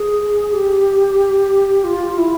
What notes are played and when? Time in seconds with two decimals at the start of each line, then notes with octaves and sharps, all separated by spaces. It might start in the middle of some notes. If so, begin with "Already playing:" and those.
Already playing: G#4
0.53 G4
1.84 F4
2.18 E4